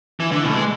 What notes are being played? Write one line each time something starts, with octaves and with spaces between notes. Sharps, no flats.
E3
D3
B2
A3
G#3